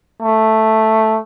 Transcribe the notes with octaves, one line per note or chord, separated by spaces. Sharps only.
A3